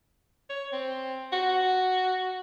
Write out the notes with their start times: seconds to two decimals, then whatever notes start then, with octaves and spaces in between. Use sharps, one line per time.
0.50 C#5
0.73 C4
1.32 F#4